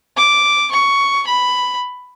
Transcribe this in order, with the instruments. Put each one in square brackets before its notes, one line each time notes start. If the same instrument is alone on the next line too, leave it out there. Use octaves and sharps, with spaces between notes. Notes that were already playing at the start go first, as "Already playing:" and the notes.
[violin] D6
C#6
B5